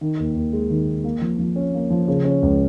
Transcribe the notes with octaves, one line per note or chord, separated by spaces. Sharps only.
D#3
D#2
D#2
G#3
D#3
D#2
A#3
F3
F3
C#4
A#3
F3
C#3
C#4
C#2